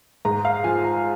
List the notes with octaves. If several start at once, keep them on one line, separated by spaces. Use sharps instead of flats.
G#2 A#5
F5
F3 G#5
A#5